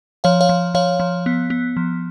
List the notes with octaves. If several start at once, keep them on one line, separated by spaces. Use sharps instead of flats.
F3 C#5 F5
C#5 F5
F3
F3 C#5 F5
F3
B3
B3
F3